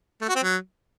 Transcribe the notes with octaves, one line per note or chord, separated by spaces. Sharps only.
A3
F#4
C4
F#3